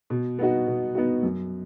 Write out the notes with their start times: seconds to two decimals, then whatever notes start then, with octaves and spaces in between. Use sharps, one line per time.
0.10 B2
0.39 B3 D#4 F#4
0.67 B2
0.95 B3 D#4 F#4
1.23 F#2